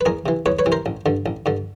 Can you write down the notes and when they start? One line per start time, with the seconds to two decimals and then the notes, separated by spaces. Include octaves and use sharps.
0.01 B4
0.06 E2 G#4 A#4
0.26 C3 E3
0.46 E2 B4 C#5
0.59 B4 C#5
0.66 C3 E3
0.72 A#4 C5
0.86 A1
1.06 G2 D3
1.26 A1
1.46 G2 D3